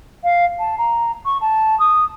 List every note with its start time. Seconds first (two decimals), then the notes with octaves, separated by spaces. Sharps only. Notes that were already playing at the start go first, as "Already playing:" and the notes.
0.23 F5
0.59 A5
0.78 A#5
1.25 C#6
1.41 A5
1.79 D#6